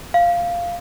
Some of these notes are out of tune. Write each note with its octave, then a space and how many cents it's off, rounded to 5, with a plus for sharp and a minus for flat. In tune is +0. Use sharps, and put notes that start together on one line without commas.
F5 -5